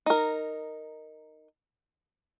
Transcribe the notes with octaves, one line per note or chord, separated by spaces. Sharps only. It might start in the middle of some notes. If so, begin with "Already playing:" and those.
D#4 A#4